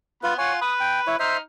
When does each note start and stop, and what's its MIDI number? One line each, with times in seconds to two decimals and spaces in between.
0.23 0.36 59
0.23 0.34 65
0.23 0.34 71
0.23 0.36 83
0.38 0.58 65
0.38 0.53 73
0.38 0.58 78
0.38 0.58 80
0.61 1.18 71
0.61 0.73 87
0.80 1.00 79
1.07 1.16 64
1.07 1.16 73
1.19 1.39 63
1.19 1.37 72
1.19 1.37 76
1.19 1.39 89